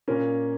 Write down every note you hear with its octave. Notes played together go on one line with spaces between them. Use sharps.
A#2 A#3 C#4 A#4